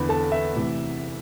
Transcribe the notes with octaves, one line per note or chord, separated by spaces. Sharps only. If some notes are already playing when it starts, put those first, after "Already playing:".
Already playing: E2 D3 B4 B5
A4 A5
E5
D2 C3 E3